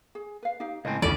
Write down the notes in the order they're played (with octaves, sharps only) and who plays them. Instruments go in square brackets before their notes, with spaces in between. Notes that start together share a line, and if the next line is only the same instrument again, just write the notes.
[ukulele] G#4
B4 F5
D#4 G4 F5
[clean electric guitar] C#2 A2 C4 [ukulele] D#5 G#5
[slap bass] D2 E3 [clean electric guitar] C#3 [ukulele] F4 A4 D#5 [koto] D5